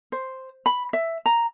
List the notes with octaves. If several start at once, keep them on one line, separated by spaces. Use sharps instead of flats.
C5
B5
E5
A#5